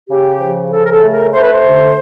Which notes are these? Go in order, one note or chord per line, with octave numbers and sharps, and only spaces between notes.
C#3 G4
F3
C#3 A4
A#4
A4
A3
A#4
A3 C5
B4
C5
D3